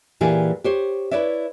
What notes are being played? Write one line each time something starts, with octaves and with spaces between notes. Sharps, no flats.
A#2 E3 G4 G#4
G4 C5 C#5
E4 B4 C#5 D5 E5